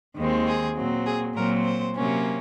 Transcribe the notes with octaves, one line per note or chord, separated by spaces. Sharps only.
D#2 D#3 G#3 C4
G#4
A#2 F#3 C4
G#4
A#2 F#3 C4 A#4
C5
C3 F#3 A#3 C#4